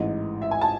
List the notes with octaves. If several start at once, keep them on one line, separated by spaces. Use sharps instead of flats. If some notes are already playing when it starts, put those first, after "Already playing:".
Already playing: A1 G#2 E3 D#5
E5
G#5
A5